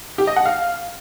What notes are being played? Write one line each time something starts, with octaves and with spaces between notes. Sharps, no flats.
G4
D#5
F#5
F5